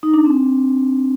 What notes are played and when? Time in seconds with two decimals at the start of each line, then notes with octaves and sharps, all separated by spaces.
0.03 D#4
0.14 D4
0.25 C4